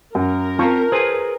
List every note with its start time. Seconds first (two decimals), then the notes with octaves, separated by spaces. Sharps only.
0.15 F#2 A#4
0.59 C4 C#4 F4 A5 C#6
0.92 G#4 B4 C5 G#5